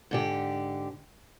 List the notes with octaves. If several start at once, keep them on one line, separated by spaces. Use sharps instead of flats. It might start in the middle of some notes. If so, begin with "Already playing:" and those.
G#2 D3 G4